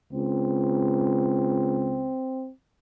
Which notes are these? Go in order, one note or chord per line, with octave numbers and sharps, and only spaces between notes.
C#2 C4